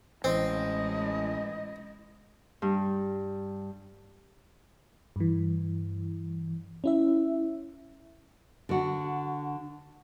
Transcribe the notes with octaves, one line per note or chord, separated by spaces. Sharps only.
A1 G#3 C4 E4 D#5
G2
G2 E3
C#4 E4 E5
D3 F#4